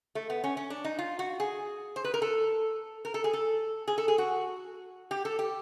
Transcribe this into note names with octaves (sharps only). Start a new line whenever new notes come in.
A3
B3
C#4
C#4
D4
D#4
F4
F#4
G#4
C5
B4
A#4
A4
A#4
A4
G#4
A4
G#4
A4
G#4
F#4
G4
A4
G4